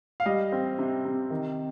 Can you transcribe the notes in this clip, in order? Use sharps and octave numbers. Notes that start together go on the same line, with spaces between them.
F5
G3 D#5
C4
C3
C3
D#3